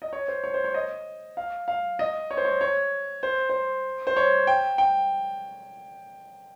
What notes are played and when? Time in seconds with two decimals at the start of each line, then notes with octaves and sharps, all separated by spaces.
0.02 D#5
0.13 C#5
0.28 C5
0.44 C#5
0.54 C5
0.64 C#5
0.74 D#5
1.37 F5
1.68 F5
1.99 D#5
2.31 C#5
2.37 C5
2.45 C#5
2.61 C#5
3.23 C5
3.49 C5
4.07 C5
4.16 C#5
4.47 G5
4.78 G5